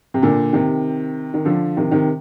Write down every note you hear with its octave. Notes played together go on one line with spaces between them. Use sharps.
C3
A#2 D3
C3 D#3
D#3
D3 F3
C3 D#3
C3 D#3